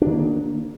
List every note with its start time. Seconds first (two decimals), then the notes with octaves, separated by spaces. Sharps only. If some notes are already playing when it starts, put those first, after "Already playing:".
0.02 D4
0.06 D#3
0.11 A#3